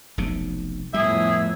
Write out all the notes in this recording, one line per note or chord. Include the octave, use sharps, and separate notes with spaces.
F1 B1 C3
F2 A2 G3 B3 G#4 E5